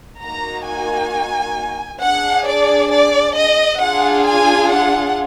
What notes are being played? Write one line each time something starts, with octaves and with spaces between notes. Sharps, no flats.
A#3 D#4 F#4 A#5
G#5
D4 G#4 F#5
D5
D5
D#5
D4 F4 G#4 F#5
G#5
F#5